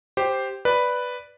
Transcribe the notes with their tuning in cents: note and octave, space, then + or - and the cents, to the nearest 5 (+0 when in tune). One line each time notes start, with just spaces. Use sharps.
G4 +0 C5 +0
B4 +0 D5 +0